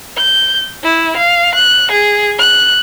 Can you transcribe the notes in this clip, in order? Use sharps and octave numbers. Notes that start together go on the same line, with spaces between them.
G6
E4
F5
F#6
G#4
F#6